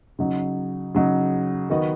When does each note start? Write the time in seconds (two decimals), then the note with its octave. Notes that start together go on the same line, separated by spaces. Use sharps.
0.19 C#3 F#3 D#4
0.95 C#3 F#3 D#4
1.70 D#3 B3 F#4 D#5